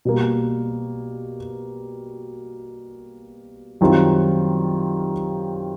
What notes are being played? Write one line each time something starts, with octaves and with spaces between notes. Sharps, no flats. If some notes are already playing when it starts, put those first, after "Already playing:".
B2 G3 A#3
F#2 D#3 G3 C4 F4